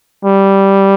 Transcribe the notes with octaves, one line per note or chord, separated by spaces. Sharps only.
G3